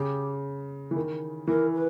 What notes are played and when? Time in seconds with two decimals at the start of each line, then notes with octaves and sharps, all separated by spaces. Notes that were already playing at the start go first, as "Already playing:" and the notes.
Already playing: C#3 G4
0.91 E3
0.96 D#3
1.47 E3 A#4
1.73 B4